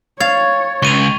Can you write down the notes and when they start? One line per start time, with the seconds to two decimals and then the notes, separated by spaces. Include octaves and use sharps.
0.20 C#5 F5 G#6 A6
0.82 C#2 C#6 D#7 F7